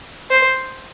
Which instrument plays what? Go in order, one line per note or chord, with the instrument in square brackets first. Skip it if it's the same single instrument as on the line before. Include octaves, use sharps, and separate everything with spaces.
[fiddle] C5